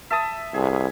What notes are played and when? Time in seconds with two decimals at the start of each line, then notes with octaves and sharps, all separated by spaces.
0.10 E5 A5 D#6
0.54 C2 G#4